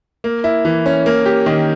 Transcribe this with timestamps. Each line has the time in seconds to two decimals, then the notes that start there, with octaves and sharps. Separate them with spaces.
0.24 A#3
0.44 E4
0.65 E3
0.86 C#4
1.06 A#3
1.26 G4
1.46 D#3